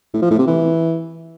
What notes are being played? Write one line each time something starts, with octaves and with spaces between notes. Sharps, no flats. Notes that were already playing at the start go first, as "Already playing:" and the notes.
A2
F3
A2
C3
E3